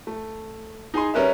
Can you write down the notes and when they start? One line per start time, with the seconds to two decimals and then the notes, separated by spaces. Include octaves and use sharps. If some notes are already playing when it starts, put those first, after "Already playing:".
0.07 A3
0.94 D#4 G#4 G#5 C6
1.14 G3 C#4 A#4 B4 E5